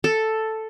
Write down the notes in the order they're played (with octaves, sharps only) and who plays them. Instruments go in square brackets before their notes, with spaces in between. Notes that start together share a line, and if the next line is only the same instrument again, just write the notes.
[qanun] A4